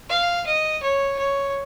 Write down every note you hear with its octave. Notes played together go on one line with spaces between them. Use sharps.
F5
D#5
C#5
C#5